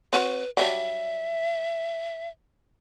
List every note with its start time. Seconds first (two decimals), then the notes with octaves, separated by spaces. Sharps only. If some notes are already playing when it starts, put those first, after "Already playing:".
0.13 C4 F#4 B4 C#5
0.57 F#3 G3 D4 E5